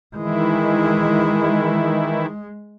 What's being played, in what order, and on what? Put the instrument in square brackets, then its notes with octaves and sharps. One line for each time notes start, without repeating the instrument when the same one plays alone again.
[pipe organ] D#3 E3 E4 [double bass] G#3